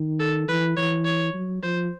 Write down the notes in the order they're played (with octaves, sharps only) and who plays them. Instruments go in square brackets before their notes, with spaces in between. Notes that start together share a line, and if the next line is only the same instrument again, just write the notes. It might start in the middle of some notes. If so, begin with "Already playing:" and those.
Already playing: [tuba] D#3
[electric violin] A4
[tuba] E3 [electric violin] B4
[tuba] E3 [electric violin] C#5
[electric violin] C#5
[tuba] F#3
[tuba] F3 [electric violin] C5